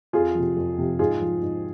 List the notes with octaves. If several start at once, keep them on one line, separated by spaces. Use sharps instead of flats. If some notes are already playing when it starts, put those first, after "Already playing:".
F2 F4 G#4
C3 F3
F2
C3 F3
G#2 F4 G#4
F3
G#2